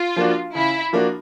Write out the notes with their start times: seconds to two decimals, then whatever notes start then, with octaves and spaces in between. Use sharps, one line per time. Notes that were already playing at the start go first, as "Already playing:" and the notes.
Already playing: F4
0.16 F3 A#3 D4 F#4
0.55 C#3 E4
0.93 F3 A#3 D4 F#4